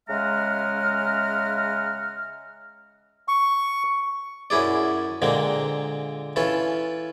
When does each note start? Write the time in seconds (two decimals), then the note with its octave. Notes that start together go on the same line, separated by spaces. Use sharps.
0.08 C#3 G#3 E5 F#5 A#5 F6
3.28 C#6
4.50 F#2 C#4 E4 G#4 D5
5.22 A#2 D3 G#3 A#3 C4
6.36 E3 C#4 F4 A4